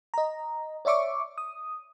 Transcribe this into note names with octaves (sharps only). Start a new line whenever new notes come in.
D#5 A#5
C#5 D5 E5 C#6 D6
D#6